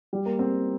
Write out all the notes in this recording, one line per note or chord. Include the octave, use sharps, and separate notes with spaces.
G3
A#3
C4